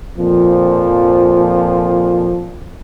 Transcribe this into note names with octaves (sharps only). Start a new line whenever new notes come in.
F2 A#2 F3